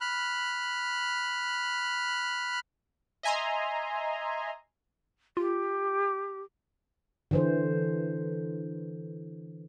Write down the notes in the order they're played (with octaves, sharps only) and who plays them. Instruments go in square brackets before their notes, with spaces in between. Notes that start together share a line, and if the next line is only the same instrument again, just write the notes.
[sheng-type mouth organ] B5 F6 F#6
[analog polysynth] D#5 E5 G#5 A#5 C6
[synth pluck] F4 [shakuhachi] G4
[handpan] D3 E3 C5